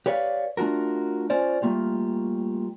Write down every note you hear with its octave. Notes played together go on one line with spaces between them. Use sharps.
G4 B4 C#5 D5 E5 F5
A3 D4 F4 F#4 A#4
C#4 F4 C5 D5
G3 A3 A#3 F4 G4